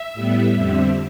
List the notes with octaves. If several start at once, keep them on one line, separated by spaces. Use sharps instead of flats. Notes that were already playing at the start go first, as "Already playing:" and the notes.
Already playing: E5
A2 G3 B3
F2 D3 G3 C4